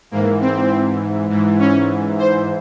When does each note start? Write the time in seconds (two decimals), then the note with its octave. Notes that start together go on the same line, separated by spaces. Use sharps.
0.11 G#2 E3 A#3
0.41 C4
1.29 G#2 E3
1.59 C#4
2.19 C5